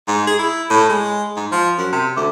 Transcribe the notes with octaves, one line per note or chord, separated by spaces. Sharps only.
G#2
G#4
E4
A2
G#3
G#2
F3
F#2
C3
D2